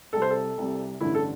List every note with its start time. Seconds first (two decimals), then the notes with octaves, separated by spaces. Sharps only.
0.13 C2 C3 G3 A4
0.22 C5
0.31 A4
0.58 C2 C3 G3
1.01 A1 G2 D3 E4
1.15 A4